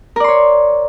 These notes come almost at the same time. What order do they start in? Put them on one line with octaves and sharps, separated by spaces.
A#4 D5 C6 C#5